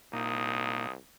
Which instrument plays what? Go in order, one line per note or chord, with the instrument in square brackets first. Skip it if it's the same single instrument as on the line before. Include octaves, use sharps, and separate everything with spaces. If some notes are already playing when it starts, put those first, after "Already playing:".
[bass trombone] C2 [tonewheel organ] A#2 A#3 D#4 [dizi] D#6